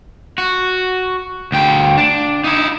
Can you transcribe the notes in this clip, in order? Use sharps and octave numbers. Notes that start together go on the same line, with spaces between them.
F#4
D2 G5
D4
D#4 E4